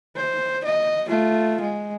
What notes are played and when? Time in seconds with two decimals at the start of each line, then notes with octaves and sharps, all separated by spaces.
0.16 C5
0.64 D#5
1.08 A3 F4
1.61 G#3